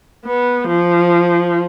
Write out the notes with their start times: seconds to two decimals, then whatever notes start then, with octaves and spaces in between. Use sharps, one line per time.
0.26 B3
0.68 F3